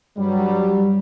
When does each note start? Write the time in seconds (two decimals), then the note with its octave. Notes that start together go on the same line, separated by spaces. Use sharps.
0.17 G2 F#3 G3